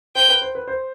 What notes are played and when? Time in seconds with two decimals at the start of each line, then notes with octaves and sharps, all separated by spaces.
0.15 C5 G5
0.29 B4
0.42 C5
0.55 B4
0.68 C5